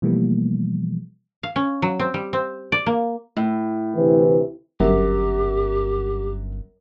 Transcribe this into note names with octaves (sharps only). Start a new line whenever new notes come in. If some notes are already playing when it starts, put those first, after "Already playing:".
B2 E3 F3 G3 A3 A#3
F5
C#4
F#3
C4
G3
C4
D5
A#3
A2
D2 C3 E3
G1 F#2 G4